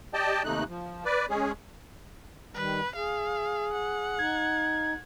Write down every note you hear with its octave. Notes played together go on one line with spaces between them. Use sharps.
G4 D5 D#5 G5 A5
D#2 C3 A3 D#4 F#6
F3
B4 D5
G#3 C#4 G#4
D#3 G3 B4
G#4 F5
F#5
D#4 G#6